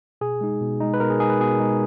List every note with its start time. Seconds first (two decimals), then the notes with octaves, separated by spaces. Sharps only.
0.21 B2 G#4
0.41 G#3 D#4
0.61 B2
0.80 G#3 D#4
0.94 B4
1.00 B2 A#4
1.10 G#4
1.20 G#3 D#4 G#4
1.30 B4
1.40 B2 G#4
1.60 G#3 D#4